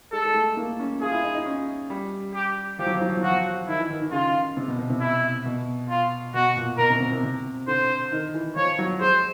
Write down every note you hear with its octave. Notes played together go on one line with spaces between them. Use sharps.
G#3 A4
G#3
A3
A#3
C#4
F4 G#4
E4
D#4
D#4
C#4
G3
G4
F3 G4
F#3
F3
F#3
F3
F#3
F3 F#4
D#3 E4
E3
D#3
D#3
C#3 F4
C3
B2
B2
C3
E4
B2
F4
B2 F#4
A#2
B2 A#4
C3
C3
C3
C3
D3 C5
D#3
E3
F3 C#5
F#3
G#3 C5